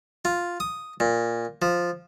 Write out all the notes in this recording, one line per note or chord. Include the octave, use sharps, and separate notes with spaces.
F4
D#6
A#2
F3